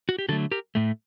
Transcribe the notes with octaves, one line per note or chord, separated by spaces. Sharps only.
F#4
G4
D3 F#3 A3 F#4 A4
G4 A#4
A2 A3